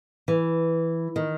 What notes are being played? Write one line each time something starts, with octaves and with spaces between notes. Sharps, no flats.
E3
D#3